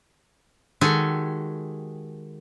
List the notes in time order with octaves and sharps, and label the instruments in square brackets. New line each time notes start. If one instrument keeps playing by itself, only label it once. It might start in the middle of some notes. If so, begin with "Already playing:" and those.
[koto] D#3 G#3 F#4 G4 A4 G#5